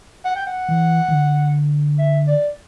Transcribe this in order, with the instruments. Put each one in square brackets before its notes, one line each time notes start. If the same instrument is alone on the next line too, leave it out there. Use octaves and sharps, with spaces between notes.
[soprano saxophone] F#5
G5
F#5
[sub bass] E3
E3
D3
[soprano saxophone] E5
D5